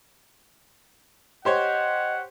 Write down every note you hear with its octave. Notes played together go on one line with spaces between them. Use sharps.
G4 C5 C#5 D#5 F#5